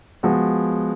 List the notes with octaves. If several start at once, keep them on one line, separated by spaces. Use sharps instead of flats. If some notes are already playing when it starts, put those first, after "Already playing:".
F3 G#3 B3 F#4